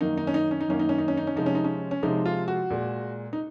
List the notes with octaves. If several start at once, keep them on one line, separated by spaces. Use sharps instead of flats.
F#2 D#3 A#3 D#4
D#4
C#4
D#4
C#4
D#4
F#2 D#3 A#3 C#4
D#4
C#4
D#4
C#4
D#4
C#4
C3 F3 G#3 D#4
C#4
D#4
C#4
C#4
C3 F3 G#3 D#4
F4
F#4
A#2 G#3
D#4